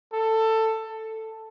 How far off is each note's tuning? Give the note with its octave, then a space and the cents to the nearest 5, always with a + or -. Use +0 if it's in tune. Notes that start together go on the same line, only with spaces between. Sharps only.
A4 +15
A4 +5